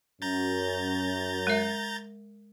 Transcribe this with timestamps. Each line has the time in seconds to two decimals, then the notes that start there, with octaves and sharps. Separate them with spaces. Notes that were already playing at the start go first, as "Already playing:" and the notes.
0.22 F#2 A#5 G6 A6
1.47 G#3 A#4 E5